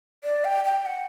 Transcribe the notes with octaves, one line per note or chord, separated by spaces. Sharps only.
D5
G5
G5
F#5